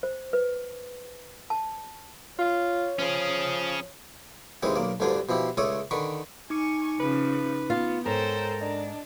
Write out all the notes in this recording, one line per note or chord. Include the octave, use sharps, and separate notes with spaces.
C5
B4
A5
F4 C#5
F3 C#4 G#4
D#2 E3 G#3 C4
B1 A#3 D5
A1 D2 G2 D3 D4 C5
B2 F3 E4 G4
C#2 A3 A4 C#5 D5 D#6
D3 D#3 B4 C#6
D#4 G#5 C#6 D6 C#7
C#3 F3 B4
B3 F4
G#2 A4 A#4 C5 C#5 G5
D4 D5 D#5